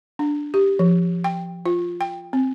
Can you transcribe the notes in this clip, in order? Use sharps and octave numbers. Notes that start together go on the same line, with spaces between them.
D4
G4
F3
G5
F4
G5
C4